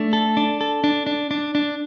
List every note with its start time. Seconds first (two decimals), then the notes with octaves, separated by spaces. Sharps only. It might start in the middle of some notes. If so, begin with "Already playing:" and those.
Already playing: A3 D4
0.13 A4
0.37 D4
0.61 A4
0.84 D4
1.07 D4
1.31 D4
1.55 D4